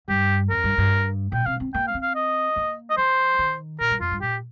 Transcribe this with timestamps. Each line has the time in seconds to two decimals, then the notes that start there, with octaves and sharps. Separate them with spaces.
0.08 G2 G4
0.49 F2 A#4
0.64 G2
0.78 G2
1.32 A#2 G5
1.46 C3 F5
1.60 C4
1.74 A#3 G5
1.87 F5
1.94 C4
2.02 F5
2.15 D#5
2.56 A#3
2.90 D#5
2.97 F3 C5
3.39 D#3
3.80 A#2 A#4
3.90 G2
4.00 F2 F4
4.11 G2
4.21 A#2 G4